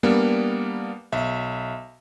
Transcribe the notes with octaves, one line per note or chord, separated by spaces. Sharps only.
G3 A#3 B3 D4
B1 E5